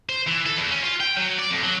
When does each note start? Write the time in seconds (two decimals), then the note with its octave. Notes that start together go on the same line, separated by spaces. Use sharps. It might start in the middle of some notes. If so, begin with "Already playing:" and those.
0.09 C5
0.27 E3
0.46 A4
0.58 E2
0.71 C#4
0.84 F4
1.00 G5
1.17 F#3
1.39 D5
1.51 F2
1.63 F#3